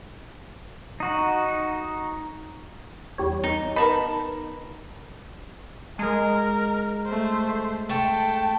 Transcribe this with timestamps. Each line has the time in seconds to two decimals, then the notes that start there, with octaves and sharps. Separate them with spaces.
1.00 D#4 F#4
3.18 E2 G3 C#5
3.44 D#4
3.76 B3 D#4 A#4 A5 B5
5.99 G#3 A#4
7.06 A3 C5
7.89 A3 G5 A5